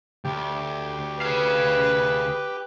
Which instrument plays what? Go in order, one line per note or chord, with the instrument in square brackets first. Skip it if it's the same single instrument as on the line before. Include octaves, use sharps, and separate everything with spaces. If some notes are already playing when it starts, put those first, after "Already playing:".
[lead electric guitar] D2 [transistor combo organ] G4
[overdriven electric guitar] G#4 F5 [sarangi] B4